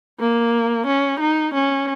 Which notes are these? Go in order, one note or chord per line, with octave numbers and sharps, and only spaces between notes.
A#3
C#4
D#4
C#4